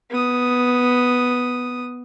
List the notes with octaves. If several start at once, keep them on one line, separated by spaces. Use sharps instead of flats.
B3 D#6